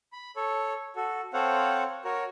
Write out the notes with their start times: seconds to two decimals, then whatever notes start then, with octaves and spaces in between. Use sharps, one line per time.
0.13 B5
0.36 A4 C#5
0.96 F#4 A4
1.33 C4 A4 C5 C#5 F5 F#5
2.04 F#4 A#4 C#5